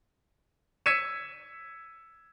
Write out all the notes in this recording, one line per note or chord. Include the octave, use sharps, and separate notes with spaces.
E6 G#6 B6 C#7 D#7 E7